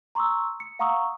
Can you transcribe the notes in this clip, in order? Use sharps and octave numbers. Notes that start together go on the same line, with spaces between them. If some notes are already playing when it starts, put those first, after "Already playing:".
A#5 C6 C#6 D#6 E6
C#7
F5 F#5 A#5 C#6 D#6 E6